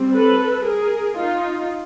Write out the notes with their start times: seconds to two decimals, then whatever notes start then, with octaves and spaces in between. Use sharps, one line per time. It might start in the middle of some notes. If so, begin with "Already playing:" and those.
Already playing: G3 C4
0.13 A4 B4
0.65 G#4 A#4
1.17 D#4 F4